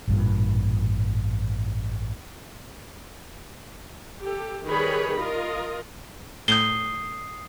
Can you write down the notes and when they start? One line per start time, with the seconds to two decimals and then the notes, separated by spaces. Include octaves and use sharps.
0.08 A1 G2 A#2
4.22 G4 A4
4.65 D#3 G3 G#4 B4 C#5 B5
5.18 F4 A#4 D#5
6.48 A2 D#6 G6 C7 G7